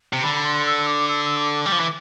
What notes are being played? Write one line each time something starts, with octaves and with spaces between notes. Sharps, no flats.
C3
D3 B5
B5
C6
E6
D6
E6
E6
D6
G3 D6
F3
E3